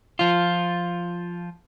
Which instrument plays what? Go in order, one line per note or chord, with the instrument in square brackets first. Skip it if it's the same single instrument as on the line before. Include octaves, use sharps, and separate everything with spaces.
[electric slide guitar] F3 F4